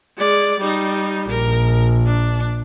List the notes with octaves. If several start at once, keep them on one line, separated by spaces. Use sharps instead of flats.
G#3 D5
G3 D#4
A#1 A#4
D4